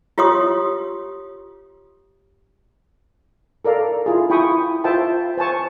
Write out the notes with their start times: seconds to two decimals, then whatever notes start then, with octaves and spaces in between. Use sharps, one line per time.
0.18 F4 G4 C#5 C6 D#6
3.65 A4 A#4 D5 F5
4.06 E4 F4 G#4
4.30 E4 G5 B5 C#6 D#6
4.84 F4 C5 E5 G5 A5 C6
5.37 C5 G#5 A5 C#6